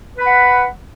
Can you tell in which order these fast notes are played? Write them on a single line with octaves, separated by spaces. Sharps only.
B4 B5 F#5